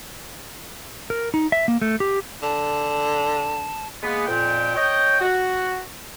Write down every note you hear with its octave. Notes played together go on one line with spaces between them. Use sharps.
A#4
D#4
E5
A#3
A3
G4
D3 A5
G#3 A#3 B3
F2 A#2 G5
C#5 D#5 G5
F#4